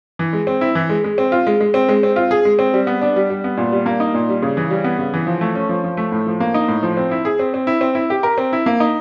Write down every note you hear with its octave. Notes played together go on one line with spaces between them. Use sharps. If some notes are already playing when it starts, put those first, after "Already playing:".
E3
G#3
C4
E4
E3
G#3
G#3
C4
F4
G#3
G#3
C4
G#3
C4
F4
G#4
G#3
C4
G3
B3
D4
G3
G3
B3
A#2
G3
A#3
D#4
A#2
G3
C#3
E3
G3
B3
C#3
E3
F3
A3
C#4
F3
F3
A3
A2
F3
A#3
D#4
A2
F3
C4
E4
G#4
C4
C4
E4
C4
E4
G4
A#4
C4
E4
A#3
D#4